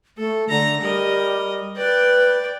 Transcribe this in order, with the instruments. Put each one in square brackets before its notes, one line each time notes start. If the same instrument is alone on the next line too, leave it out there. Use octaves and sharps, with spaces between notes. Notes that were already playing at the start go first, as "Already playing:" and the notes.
[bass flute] A3 [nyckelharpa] A4
[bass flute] D3 [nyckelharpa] A3 A#5
[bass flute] G3 [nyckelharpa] A#4 D#5
[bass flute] B4 [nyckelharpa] D5 G5